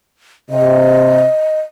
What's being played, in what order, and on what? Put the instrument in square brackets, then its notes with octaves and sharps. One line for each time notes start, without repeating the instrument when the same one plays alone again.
[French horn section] C3 [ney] D#5